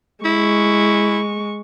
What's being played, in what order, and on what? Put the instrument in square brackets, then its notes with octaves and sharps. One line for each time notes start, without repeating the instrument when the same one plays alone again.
[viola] G#3 C#6 [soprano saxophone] E4